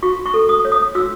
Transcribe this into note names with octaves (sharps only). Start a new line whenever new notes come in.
F#4 C#6
C#6
A4
D#6
C#5
D#6
F#4 E6